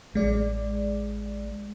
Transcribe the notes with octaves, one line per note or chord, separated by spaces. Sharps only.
A1 G#3 D5